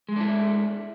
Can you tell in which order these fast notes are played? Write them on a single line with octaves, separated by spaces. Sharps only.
G#3 A3 D4 E4